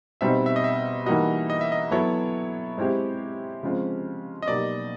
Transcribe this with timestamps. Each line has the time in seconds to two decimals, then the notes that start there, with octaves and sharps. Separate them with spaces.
0.21 B2 G3 C4 D#4 E5
0.46 E5
0.56 D#5
0.64 E5
1.06 E3 G3 A#3 D#4 F#4 D#5
1.50 D#5
1.61 E5
1.72 D#5
1.91 F#3 B3 E4 A4 C#5
2.78 G#3 C4 E4 G4
3.63 C#3 F3 G#3 C4 F4
4.42 D#5
4.48 B2 F#3 A#3 D#4 G4 D5